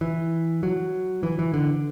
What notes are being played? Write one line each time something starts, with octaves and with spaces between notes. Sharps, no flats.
E3
F#3
E3
E3
D3